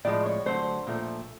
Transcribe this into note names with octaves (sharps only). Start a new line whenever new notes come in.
A2 F3 G#3 D5
C#5
D3 F#3 A3 C5
A#2 F3 A3